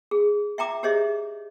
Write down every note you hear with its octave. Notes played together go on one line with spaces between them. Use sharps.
G#4
E5 G5 A#5 D6
G4 G#4 C5 C#5 D#5 E5